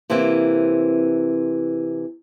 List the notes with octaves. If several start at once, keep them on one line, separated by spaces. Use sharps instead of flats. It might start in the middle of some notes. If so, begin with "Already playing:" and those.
C3 E3 A#3 C4